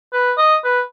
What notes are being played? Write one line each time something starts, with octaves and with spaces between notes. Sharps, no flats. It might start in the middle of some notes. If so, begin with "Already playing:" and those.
B4
D#5
B4